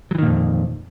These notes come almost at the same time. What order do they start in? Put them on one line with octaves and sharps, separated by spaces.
F#3 E3 D#3 A#2 F2